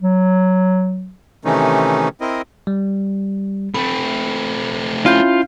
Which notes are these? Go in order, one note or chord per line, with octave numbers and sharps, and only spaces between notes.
F#3
C3 D#3 E3 A3 C#4 D#4
C4 E4 A#4 D#5
G3
A3 C4 B5
C#4 E4 F4 G6